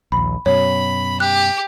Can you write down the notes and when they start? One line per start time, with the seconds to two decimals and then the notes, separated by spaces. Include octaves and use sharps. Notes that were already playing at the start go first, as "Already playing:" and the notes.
0.12 A#1 D#2 B5
0.46 F#2 B2 C#5 B5
1.20 G4 F#6